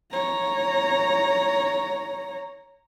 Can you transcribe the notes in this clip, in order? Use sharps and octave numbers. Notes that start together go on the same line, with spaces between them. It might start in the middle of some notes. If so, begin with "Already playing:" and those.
C#5 A#5